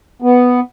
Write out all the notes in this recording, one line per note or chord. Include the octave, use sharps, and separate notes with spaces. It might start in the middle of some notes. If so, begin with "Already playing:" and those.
B3